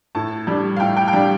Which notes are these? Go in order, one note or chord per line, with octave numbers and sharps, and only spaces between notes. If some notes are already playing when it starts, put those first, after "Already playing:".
A2 A5
G3 D4
F5
A2 G5
G5
G5
G3 D4 F5